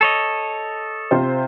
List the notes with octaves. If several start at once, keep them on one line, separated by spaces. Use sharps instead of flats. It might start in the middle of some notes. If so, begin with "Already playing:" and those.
A4 C#5 D#5
C3 F4 C5